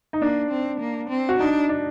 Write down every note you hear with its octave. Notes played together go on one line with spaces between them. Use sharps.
D#4
A#3 D4
C4
A#3
C4
F#4
D4 D#4
D4